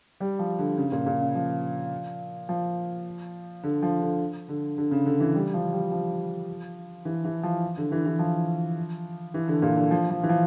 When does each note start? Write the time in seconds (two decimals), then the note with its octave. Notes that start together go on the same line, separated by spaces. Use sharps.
0.20 G3
0.39 F3
0.59 D3
0.77 C#3
0.92 A#2
1.06 A#2
1.21 C#3
1.35 F3
2.49 F3
3.63 D3
3.82 F3
4.01 D3
4.49 D3
4.78 D3
4.91 C#3
5.06 D3
5.20 E3
5.35 G3
5.54 F3
5.73 G3
5.92 F3
7.05 E3
7.25 E3
7.43 F3
7.77 D3
7.92 E3
8.06 E3
8.19 F3
9.34 E3
9.48 D3
9.62 A#2
9.77 D3
9.91 F3
10.10 F3
10.23 E3
10.29 F3